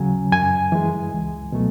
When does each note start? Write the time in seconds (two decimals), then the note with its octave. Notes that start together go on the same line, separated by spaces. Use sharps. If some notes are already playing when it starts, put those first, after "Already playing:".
Already playing: D#2 C#3 F#3 G#5
0.32 F#2 G#5
0.72 E3 G#3
1.13 C#2
1.52 B2 F#3 A3